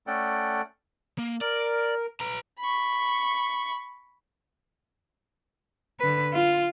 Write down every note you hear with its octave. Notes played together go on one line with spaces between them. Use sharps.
A3 C#4 A4 D5 F#5 G5
A#3
A#4 D5
B4 A#5
B5 C#6
D3 B4
F4